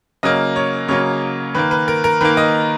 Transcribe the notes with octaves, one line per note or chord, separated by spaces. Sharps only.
C#3 F#3 A#3 D#5
C#5
C#3 F#3 A#3 C#5
D#3 A#3 B4
B4
A#4
A#4
D#3 A#3 B4
D#5